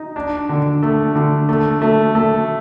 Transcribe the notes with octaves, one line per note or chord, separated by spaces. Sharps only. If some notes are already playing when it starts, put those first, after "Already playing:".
Already playing: D#4
D4
D3
A3
D3
A3
A3
A3